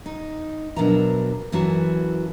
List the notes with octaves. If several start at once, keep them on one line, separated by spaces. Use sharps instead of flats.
D#4
B2 F#3 D4 A#4 E5 A#5
F#2 E3 E4 F#4 A5 A#5